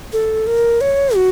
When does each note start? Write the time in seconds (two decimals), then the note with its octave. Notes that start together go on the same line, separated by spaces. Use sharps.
0.13 A4
0.47 A#4
0.81 C#5
1.15 F#4